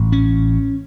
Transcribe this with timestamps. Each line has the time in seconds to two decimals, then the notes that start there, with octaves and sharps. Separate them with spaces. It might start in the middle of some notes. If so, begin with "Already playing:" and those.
Already playing: A1 A2
0.12 C#4